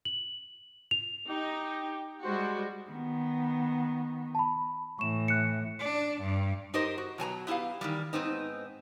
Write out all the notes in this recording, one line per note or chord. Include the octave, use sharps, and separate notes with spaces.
F#7
F7
D#4 G4
G3 G#3 F#4 C5
D#3 B3
A5 B5
A2 E3 C#6 E7
F#6 C#7
D4
G2
D#4 G4 A#4 C5 D#5
F#4
B2 F#3 G#5 A#5
B3 E4 F#4 G4 F5
D#3 E3 G3
G#2 B3 C4 D#4